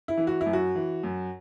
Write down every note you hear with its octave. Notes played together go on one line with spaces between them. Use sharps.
E4
E3
F#4
E4
F#2
F#4
E3
F#2